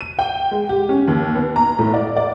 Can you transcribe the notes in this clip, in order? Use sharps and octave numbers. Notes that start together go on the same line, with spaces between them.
D#7
G5
G#3
G4
C#4
D#2
B3
A#5
A2
D5
D5